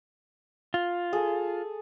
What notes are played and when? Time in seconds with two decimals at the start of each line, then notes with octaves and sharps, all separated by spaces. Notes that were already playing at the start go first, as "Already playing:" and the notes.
0.74 F4
1.13 G#4 A4